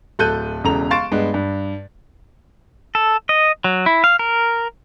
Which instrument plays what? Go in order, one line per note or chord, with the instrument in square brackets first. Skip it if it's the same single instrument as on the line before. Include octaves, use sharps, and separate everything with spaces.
[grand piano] D1 A4 F#6 G6 D#7
E1 E2 C#3 A4 A#5 F7
F5 C6 C#6 A6 D7 E7
G2 G#3 B3
G2
[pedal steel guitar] A4
D#5
F#3
E4
F5
A#4